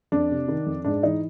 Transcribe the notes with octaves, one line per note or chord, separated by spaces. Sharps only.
F2 D4
C3
D#3
F2
G#2 D4
E3 D#4